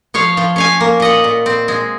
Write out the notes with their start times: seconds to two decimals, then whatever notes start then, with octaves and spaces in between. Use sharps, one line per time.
0.14 F3 C#5 F5
0.37 F3
0.56 C#4 F5 G#5
0.80 A#3
1.00 A#2 D#5 F#5
1.24 A#2
1.46 C4
1.68 G#3